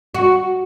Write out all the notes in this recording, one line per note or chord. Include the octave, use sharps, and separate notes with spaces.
F#4